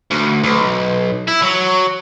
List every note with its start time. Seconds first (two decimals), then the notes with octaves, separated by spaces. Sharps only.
0.11 D2
0.44 B1
1.28 E4
1.43 F#3